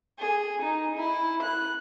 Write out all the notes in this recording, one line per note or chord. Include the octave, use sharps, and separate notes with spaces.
G#4
D#4
E4
F#6